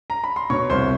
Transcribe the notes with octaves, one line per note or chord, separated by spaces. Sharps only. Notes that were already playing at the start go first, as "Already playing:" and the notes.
A#5
B5
C6
B2 C#5 C#6
C2 C5 C6